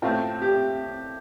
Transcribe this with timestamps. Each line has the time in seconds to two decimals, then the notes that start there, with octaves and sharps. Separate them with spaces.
0.02 A2 A3 C4 F4
0.42 G4